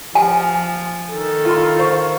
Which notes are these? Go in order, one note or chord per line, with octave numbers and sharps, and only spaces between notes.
F3 G#5
D#3 A4
F4 C6
C5 F5 C#6